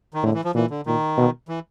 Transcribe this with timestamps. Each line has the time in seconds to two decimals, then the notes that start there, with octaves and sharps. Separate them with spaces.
0.14 D#3
0.23 A2 D3
0.34 E3
0.44 F3
0.55 A#2 E3
0.70 D3
0.86 A#2 D#3
1.18 B2
1.48 E3